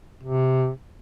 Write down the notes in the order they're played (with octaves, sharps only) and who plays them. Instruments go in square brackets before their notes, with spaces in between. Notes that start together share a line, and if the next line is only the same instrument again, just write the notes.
[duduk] C3